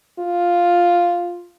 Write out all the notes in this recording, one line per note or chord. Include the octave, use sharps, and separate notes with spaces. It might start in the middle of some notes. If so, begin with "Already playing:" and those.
F4